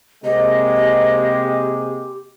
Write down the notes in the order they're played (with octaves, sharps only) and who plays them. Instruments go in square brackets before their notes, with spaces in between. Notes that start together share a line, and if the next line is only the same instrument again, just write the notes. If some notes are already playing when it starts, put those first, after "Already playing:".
[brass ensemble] C3 G#3 A#3 [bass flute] G4 [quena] D#5